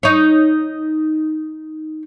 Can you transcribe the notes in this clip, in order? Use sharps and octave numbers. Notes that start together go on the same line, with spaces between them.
D#4 C#5